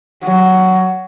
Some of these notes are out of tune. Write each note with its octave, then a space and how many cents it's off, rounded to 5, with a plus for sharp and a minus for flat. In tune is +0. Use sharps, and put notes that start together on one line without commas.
F#3 +10